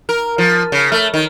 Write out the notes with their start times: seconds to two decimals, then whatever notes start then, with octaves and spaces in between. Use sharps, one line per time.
0.09 A#4
0.38 F3
0.72 C#3
0.92 A3
1.14 D#3